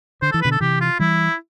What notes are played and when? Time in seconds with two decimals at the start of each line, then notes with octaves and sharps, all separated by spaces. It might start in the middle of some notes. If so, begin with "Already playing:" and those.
0.22 D3 C5
0.32 E3 A4
0.41 B2 D3 B4
0.51 A4
0.60 C3 E3 G4
0.81 F4
0.99 E3 G3 E4